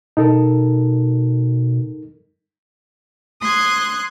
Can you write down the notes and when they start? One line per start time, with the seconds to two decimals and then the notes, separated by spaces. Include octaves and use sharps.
0.17 B2 D#4 A4 A#4
3.41 C6 D#6 F#6 G#6